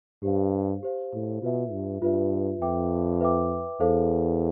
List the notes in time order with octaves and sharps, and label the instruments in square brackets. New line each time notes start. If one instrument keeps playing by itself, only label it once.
[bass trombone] G2 [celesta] G4 C5 F5
[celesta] G4 C5 F5
[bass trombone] A2
[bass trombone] B2 [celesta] F4 B4 E5
[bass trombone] G2
[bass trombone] G2 [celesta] F4 B4 E5
[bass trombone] F2 [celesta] B4 E5 G5 D6
[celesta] B4 E5 G5 D6
[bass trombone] E2 [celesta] A4 C5 F5 A5